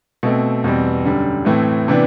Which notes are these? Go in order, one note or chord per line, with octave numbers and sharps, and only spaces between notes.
B2 A3 C4
E2 B2 G3 C4
F#2 D3 G3
A2 E3 A3 C4
C3 E3 B3 D4